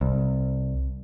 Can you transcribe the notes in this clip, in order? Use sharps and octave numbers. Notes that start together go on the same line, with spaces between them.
C2